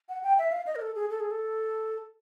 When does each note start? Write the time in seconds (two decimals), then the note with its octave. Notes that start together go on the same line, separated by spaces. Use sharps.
0.09 F#5
0.23 G5
0.38 E5
0.52 F5
0.67 D#5
0.76 A#4
0.82 A4
0.95 G#4
1.10 A4
1.20 G#4
1.31 A4